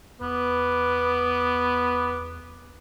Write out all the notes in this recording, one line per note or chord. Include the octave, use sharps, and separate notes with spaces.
E2 B3 B4 D6